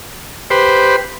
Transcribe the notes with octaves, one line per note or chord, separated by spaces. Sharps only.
G4 B4 C5